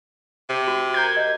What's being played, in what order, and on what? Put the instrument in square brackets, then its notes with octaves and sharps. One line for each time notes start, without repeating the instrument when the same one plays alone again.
[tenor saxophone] C3
[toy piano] F#4
[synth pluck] A#4 G6 G#6
[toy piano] D#5